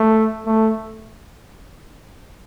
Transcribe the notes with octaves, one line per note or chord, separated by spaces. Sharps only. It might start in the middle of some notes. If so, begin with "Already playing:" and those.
Already playing: A3
A3